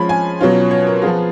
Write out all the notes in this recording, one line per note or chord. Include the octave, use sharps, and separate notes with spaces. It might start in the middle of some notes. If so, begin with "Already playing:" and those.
Already playing: F3 G#3 C#4 F4 B5
G#5
B2 F#3 C#4 F4
C#5
A#4
F3 B3 F4 G#4